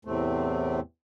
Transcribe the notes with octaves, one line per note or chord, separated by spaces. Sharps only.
E2 A2 C3 A3 C4